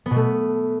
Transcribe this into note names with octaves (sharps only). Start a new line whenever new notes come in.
B3
B2
A3